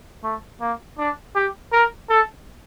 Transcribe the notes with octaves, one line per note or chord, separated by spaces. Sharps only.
A3
A#3
D4
G4
A#4
A4